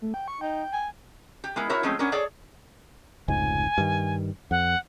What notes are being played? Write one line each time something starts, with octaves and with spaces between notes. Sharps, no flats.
A3
G5
C#6
D#4 G5
G#5
G4
G#3 B3 E4 A#4
E4 F#4 A#4 C#5 E5
F3 G#3 A3 C4 C#4
B3 C#4 D4 A#4
G#4 A4 C#5 D5
F1 C#2 G#2 G#5
G2 D#3
F2 F#5